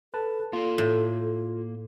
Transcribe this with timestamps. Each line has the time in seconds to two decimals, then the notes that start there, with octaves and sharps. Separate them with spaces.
0.14 A4 B4 A5
0.53 A#3 F4 A4 C6
0.78 A2